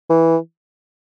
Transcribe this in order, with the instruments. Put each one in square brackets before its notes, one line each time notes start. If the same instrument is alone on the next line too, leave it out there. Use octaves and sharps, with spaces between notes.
[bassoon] E3